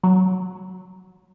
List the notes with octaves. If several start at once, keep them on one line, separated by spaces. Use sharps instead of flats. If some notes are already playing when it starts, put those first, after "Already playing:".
F#3